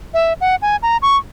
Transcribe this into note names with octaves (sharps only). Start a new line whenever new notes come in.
E5
F#5
G#5
A#5
C#6